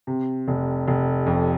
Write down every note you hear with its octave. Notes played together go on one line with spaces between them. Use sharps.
C3
F1
F1
F2